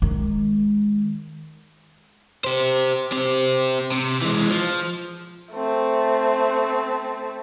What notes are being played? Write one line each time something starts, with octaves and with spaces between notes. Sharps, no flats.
D#3 G#3
G4 C5
C4 G4
C3
E3 G#3
F3
A3 C4